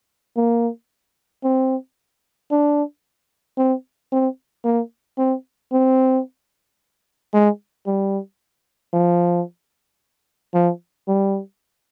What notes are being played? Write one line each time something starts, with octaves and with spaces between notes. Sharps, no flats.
A#3
C4
D4
C4
C4
A#3
C4
C4
G#3
G3
F3
F3
G3